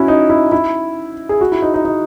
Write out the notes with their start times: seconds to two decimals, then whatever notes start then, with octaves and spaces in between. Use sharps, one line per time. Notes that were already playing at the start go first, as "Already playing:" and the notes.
Already playing: C#4 E4 F#4
0.08 D#4
0.30 E4
0.52 E4
1.29 G#4
1.41 F#4
1.52 E4
1.62 D#4
1.74 D#4
1.85 D#4